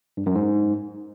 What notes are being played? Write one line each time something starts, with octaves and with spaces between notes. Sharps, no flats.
G2
F#2
G#2